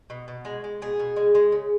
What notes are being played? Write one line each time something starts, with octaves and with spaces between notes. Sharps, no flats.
B2
B2
G#3
G#3
B2 G#4
B2
G#3
G#3
C#3